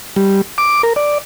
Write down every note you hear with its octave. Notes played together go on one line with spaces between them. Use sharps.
G3
D6
A#4
D5